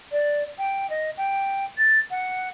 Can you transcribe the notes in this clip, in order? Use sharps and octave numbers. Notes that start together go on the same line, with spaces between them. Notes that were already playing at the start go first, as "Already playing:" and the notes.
D5
G5
D#5
G5
A6
F#5